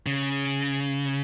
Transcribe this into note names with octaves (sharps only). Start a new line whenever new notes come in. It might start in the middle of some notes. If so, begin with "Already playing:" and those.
C#3